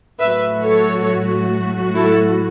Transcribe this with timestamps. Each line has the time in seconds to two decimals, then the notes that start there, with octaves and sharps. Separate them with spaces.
0.19 A2 F#3 A3 F#4 B4 E5
0.64 A4 C#5
1.95 E4 A4